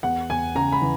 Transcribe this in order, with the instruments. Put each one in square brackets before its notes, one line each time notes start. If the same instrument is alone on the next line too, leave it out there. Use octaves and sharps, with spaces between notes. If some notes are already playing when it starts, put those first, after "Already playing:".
[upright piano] E2 F#5
E2 G#5
C#3 A#5
B5
E3